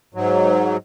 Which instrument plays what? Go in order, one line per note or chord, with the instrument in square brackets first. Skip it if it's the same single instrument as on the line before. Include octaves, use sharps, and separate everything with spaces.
[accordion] G#2 F#3